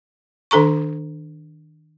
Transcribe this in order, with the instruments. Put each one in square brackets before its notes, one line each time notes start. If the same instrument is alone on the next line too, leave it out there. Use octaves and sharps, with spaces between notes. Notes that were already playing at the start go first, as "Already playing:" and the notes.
[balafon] D#3 D4 A4 A#5 C#6